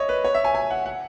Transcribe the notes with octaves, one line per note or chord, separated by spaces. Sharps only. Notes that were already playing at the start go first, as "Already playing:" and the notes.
Already playing: C#5 D#5 E5
B4
C#5
E5
G#5
G#5
F#5
F#5